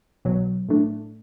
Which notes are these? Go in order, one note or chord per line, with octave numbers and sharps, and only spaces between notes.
B1 B2 F#3
A2 A3 D4